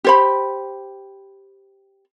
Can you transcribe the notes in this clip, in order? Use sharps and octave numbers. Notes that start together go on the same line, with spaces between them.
G4 C5 B5